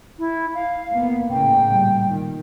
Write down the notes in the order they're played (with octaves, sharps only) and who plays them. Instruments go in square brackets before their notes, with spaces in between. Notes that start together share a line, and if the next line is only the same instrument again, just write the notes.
[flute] E4
F5
[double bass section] A#3 B3
[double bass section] A2 C#3 A#3 [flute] G5
[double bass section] A#2 G3
D#3